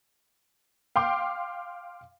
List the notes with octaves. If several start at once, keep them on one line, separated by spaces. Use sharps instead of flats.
F5 G5 C6 D6